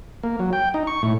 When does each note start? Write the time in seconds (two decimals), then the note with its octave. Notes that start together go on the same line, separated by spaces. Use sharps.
0.23 A#3
0.39 F#3
0.53 G5
0.74 D#4
0.87 C#6
1.03 A2